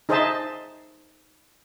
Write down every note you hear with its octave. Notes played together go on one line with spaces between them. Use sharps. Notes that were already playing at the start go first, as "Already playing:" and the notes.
D#4 G#4 C5 D#5 E5 A5